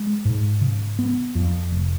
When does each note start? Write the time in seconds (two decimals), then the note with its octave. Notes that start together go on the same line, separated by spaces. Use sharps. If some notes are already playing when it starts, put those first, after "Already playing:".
Already playing: G#3
0.25 G#2
0.61 C#3
0.99 B3
1.35 F2
1.72 F1